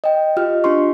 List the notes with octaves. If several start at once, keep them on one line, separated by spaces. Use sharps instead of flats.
D#5 G5
F4 G4 D#5 F6
D4 F4 G4 C6 C#6